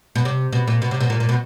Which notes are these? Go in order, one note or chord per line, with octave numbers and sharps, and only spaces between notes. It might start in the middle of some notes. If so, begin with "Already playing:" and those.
B2
C3
B2
A#2
B2
C3
B2
A#2
A#2
B2